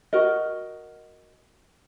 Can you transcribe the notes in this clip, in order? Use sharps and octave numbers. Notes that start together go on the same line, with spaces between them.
F#4 A#4 D#5